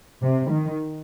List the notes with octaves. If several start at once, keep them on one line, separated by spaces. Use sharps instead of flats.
C3
D#3